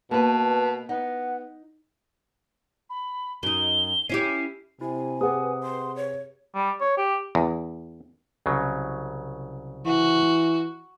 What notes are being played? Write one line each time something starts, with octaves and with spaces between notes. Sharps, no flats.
B2 A#3 B4 A5
B3 D#4 F#5
B5
F#2 D#4 G7
C#4 E4 G4 C7
C3 E4 G#5
G4 G#4 B4 F#5 D#6
C6
C#5
G3
C#5
G4
E2
C2 C#3 F#3
E3 F#4